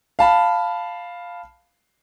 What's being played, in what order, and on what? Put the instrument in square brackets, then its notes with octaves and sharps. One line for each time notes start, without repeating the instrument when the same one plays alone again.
[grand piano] F5 A5 B5